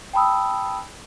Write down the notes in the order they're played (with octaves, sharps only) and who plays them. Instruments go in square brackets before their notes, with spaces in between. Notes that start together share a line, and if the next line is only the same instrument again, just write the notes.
[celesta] G5 A5 B5 D#6 E6